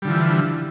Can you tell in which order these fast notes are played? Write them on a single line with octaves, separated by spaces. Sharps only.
G3 D3 F3 E3